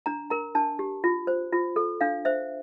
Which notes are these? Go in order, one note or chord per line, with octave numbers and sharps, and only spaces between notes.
D4 A#5
A#4 A#5
D4 A5
G4
F4
C5
F4
A4
D4 F5
C5 E5